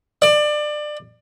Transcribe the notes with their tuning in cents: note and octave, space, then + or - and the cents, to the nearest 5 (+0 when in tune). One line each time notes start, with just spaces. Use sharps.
D5 +25